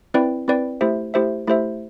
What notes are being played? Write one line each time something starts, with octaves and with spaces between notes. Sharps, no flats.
C4 E4 B4 D5 G5
C4 E4 B4 D5 G5
A3 E4 G4 C5 E5
A3 E4 G4 C5 E5
A3 E4 G4 C5 E5